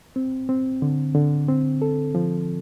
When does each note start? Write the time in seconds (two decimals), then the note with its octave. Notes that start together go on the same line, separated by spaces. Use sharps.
0.16 C4
0.49 C4
0.82 D3
1.15 D3
1.49 C4
1.82 A4
2.15 F3